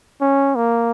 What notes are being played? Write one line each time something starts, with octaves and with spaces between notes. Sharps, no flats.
C#4
A#3